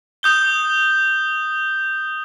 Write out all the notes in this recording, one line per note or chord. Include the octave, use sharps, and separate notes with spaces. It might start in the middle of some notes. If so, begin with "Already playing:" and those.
D#6 G6 G7